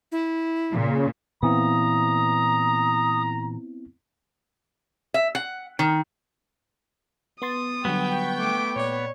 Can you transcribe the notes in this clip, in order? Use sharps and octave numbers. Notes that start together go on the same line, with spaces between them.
E4
A#2 C#3
A#2 E3 B3 C4 E4 A#5 D#6
E5
F#5
D#3
B3 C6 D#6 A6
D3 F#3 G3 B3 G5 C#6
A3 D6
A#2 C#5 D5